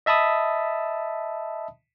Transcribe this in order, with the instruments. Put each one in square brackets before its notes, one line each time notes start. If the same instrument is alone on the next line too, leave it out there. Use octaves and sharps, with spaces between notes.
[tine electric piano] D#5 E5 A5 B5 D#6